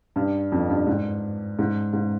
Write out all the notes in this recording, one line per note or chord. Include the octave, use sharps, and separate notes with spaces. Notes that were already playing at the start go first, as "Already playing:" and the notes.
G2
F2
G2
G#2
G#2
G#2